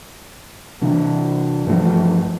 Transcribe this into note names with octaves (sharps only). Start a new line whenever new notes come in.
C3 E3 D4
G2 E3 F3 A3